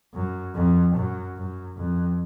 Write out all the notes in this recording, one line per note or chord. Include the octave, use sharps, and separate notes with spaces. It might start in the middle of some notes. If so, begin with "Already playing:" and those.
F#2
F2
F#2
F#2
F2